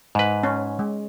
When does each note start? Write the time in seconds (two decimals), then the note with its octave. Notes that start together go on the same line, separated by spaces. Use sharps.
0.15 G#2 B4
0.43 C#4
0.79 G#3